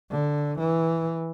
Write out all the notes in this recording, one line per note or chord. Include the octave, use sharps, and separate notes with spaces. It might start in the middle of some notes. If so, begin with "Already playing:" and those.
D3
E3